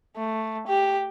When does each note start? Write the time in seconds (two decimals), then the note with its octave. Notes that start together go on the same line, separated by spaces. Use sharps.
0.16 A3
0.67 G4